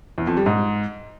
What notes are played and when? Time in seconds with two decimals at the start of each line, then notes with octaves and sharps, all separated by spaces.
0.18 E2
0.27 F2
0.37 G3
0.46 G#2